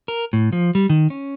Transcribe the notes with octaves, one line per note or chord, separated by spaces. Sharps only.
A#4
A2
F3
G3
D#3
C#4